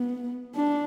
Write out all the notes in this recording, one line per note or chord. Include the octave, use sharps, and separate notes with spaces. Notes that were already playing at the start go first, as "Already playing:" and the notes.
Already playing: B3
D4